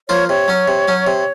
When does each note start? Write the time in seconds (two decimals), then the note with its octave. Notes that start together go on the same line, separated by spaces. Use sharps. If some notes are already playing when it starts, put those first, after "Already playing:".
0.09 F3 A#3 F4 C#5
0.29 C3 C#5
0.48 F#3 C#4
0.68 C3
0.88 F#3 C#4
1.07 C3